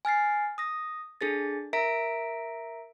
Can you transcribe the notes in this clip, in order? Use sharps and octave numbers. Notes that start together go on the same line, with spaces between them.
G#5 F6 A6 C7
D#6 A#6
D4 G#4 A4 A6
A#4 E5 A#5 B6 D7